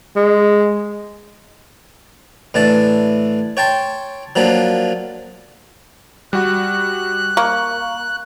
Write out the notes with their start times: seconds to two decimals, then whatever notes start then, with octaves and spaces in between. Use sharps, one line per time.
0.16 G#3
2.54 A2 E3 D4 A5
3.57 C#5 G5 A5 C6
4.36 F3 F#3 A#3 D4
6.33 G3 F#4 F#6
7.37 A#3 C#6